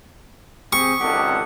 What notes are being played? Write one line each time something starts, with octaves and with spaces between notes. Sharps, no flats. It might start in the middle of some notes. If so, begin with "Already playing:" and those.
C4 G4 G#4 C#6
G#1 C#2 G4 A4 D5 D#5 F#5